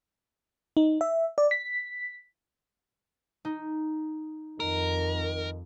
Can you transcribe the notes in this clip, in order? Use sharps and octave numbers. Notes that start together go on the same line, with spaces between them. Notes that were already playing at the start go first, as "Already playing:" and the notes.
D#4
E5
D5
B6
D#4
F2 D#3 A#4